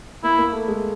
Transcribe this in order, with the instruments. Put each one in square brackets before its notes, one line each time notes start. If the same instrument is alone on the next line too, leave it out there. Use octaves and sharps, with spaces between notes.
[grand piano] A#3 [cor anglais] E4
[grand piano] A#3
A3
G#3